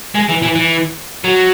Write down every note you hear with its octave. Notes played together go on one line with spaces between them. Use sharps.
G#3
E3
E3
E3
F#3